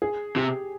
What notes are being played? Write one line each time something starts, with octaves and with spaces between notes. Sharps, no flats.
G#4
C3 G4